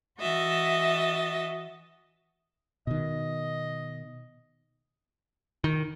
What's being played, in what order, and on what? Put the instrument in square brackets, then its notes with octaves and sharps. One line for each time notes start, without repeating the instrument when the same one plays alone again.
[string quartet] E3 F#4 D#5 E5 A6
[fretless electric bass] B2 D#3 [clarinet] D#5
[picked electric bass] D#3